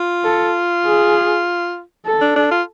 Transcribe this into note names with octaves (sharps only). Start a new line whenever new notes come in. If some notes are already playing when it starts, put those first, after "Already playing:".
Already playing: F4
A4
G#4
A4
D4
D4
F4